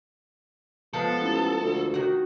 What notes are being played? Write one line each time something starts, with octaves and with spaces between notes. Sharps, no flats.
F3 G#3 B3 A4
A1
D2
D#3 F#4